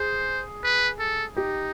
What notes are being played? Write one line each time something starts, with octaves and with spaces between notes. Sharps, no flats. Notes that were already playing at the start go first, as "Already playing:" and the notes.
Already playing: G#4 C5
B4
A4
D#4 G4